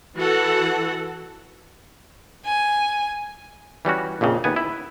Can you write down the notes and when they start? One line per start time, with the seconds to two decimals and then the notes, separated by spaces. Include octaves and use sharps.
0.16 E3 F#4 A4 F#5
2.46 G#5
3.85 E3 G3 C#4 F#4
4.21 A#1 F2 A#2 C#3
4.44 D#2 B3 G#5
4.56 E4